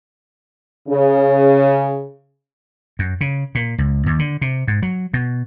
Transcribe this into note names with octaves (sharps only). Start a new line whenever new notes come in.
C#3
F#2
C#3
A#2
C#2
D#2
D3
C3
G#2
F#3
B2